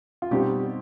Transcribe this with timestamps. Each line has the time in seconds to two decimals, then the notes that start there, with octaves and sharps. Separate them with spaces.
0.22 F4
0.31 B2 G3 C4 D#4 G4